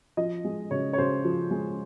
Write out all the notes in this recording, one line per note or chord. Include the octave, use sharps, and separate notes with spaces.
F3 D#5
G#3
C#3 C#5
C#5
C#3 C5
F3
G#3